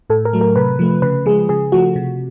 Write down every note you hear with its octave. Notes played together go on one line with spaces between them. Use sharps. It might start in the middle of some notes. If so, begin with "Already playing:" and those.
A2 A4
A#4
F#3 A3
A#4
C3 B4
F3 A3
C#3 B4
F3 G#3 G#4
C#3 G#4
F3 A3 F#4
C3